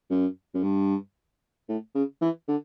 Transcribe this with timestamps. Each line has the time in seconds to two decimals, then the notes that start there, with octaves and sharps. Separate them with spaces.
0.10 F#2
0.55 F#2
0.63 G2
1.69 A2
1.95 C#3
2.21 E3
2.48 D3